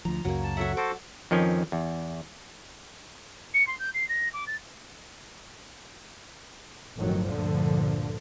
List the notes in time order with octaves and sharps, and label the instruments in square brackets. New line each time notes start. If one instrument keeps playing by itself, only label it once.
[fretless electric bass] D2 F3 [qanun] A#5
[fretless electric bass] C#2 F#2 C#3 [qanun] F#3 A#3
[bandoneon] A5
[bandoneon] F#3 E5 [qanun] F#4 A4 F#5
[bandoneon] F#4 A4 C5 [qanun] D6
[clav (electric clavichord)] F2 D#3 F3 C#4
E2
[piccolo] C#7
C6
G6
C7
A#6
D6
A6
[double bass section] G1 F2 A2 D#3 F#3
D2 G2 A#2 D3 F3